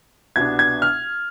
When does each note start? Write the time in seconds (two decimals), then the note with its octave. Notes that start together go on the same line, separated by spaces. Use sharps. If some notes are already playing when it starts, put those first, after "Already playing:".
0.36 C2 B2 B3 D4 G#6
0.59 G#6
0.82 F6